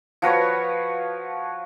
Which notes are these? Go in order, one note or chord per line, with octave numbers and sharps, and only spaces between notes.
F3 F#4 B4 C#5